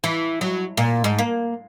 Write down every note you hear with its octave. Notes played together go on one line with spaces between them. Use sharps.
E3
F#3
A#2
G#2
A#3